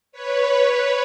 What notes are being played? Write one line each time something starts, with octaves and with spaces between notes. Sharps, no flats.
B4 C#5